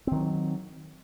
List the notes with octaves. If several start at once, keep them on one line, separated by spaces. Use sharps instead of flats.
D#3 F#3 C4